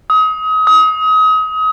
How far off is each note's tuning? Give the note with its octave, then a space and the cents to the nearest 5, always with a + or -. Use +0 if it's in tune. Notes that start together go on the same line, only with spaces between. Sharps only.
D#6 +30
D#6 +30